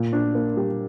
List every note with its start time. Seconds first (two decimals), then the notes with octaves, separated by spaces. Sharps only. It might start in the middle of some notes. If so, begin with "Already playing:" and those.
Already playing: A#2
0.13 D4
0.35 A#3
0.57 G3